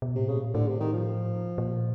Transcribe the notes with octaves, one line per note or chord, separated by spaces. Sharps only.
B2
A2 C3
A#2 C#3
A2 D3
C3
D#3
F3
A#2